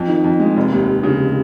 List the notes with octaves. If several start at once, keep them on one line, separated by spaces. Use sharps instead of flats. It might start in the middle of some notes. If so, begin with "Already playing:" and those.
Already playing: F2
D#3
F2
G#3
F1
D#2
F1
C#3